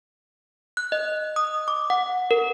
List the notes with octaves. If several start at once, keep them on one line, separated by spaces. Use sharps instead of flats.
F#6
D#5
D#6
D6
F#5
A#4